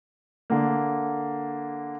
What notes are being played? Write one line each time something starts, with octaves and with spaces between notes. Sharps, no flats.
D3 A#3